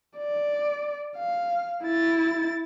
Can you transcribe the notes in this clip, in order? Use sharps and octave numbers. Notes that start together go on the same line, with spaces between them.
D5
F5
E4 A6